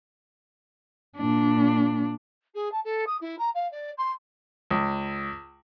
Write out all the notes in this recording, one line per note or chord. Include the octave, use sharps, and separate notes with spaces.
A#2 D4
G#4
A5
A4
D#6
E4
A#5
F5
D5
C6
C#2